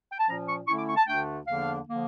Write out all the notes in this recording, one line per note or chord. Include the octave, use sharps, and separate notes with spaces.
G5
A5
A#2 F3 C#4 A#5
C#6
D3 A3 C#4 E4 C#6
D6
C#6
A5
D2 D3 A3 D4 G5
E2 D3 F3 A#3 D4 F5
D3 F3 A#3